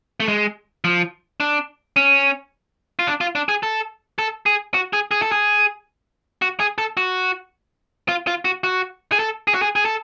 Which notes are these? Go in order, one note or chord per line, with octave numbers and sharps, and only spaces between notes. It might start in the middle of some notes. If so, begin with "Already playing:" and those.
A3
G#3
F3
D4
C#4
F4
D4
F4
D4
G#4
A4
A4
G#4
F#4
G#4
G#4
A4
G#4
F#4
G#4
A4
F#4
F4
F4
F#4
F#4
G#4
A4
G#4
F#4
G#4
G#4
A4